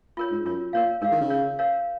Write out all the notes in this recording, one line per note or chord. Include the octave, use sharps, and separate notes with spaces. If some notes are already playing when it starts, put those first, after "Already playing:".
F4 A#4 C#5
G#2
F#2 F4 A#4 C#5
A#2 A#4 C#5 F5
G#2 A#4 C#5 F5
D#3
C#3
A#4 C#5 F5
A#4 C#5 F5